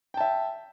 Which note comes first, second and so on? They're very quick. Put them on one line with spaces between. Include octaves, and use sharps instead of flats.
G5 A5 E5